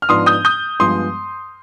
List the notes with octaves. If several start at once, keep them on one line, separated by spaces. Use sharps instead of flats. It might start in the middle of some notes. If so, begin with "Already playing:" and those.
F6
G#2 F3 B3 D4 C6 D#6
D#6 G6
D#6 G6
G2 F3 G#3 B3 C6 D#6